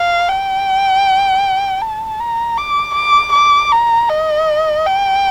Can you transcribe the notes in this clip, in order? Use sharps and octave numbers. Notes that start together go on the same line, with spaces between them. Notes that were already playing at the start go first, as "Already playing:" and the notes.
Already playing: F5
G5
A5
A#5
D6
D6
D6
A#5
D#5
G5